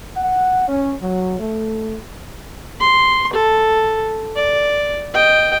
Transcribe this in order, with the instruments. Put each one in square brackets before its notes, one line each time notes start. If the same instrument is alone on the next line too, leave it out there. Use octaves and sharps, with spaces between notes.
[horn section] F#5
C#4
F#3
A3
[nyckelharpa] C6
A4
D5
D#5 G5